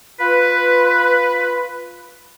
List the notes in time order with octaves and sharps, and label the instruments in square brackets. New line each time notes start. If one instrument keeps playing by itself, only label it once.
[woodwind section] F4 B4